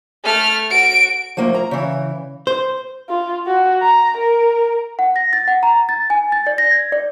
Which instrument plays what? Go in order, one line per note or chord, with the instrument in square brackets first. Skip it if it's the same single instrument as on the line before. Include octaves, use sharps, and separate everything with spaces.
[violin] A3 F6
F#4 D7
[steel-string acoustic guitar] F3 A3 A#3 F4
A#5
C#3 E3
[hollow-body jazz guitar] C5
[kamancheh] F4
F#4
A#5
A#4
[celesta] F#5
A#6
A6
F#5
A#5
A6
G#5
A6
D5
A#6
G#6
D5